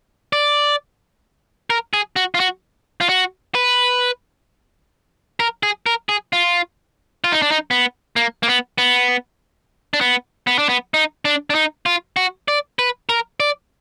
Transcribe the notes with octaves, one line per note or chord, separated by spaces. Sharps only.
D5
A#4
G#4
F#4
F4
F#4
F4
F#4
B4
A#4
G#4
A#4
G#4
F4
F4
D#4
D4
D#4
B3
A#3
A#3
B3
B3
D4
B3
B3
D4
B3
D#4
D4
D4
D#4
F4
F#4
D5
B4
A#4
D5